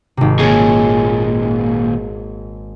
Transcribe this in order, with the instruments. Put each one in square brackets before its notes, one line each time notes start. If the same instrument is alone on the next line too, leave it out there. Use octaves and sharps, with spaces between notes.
[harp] G#1 C3
[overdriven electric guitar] D#2 A#2 [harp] G#4 C#5 G#5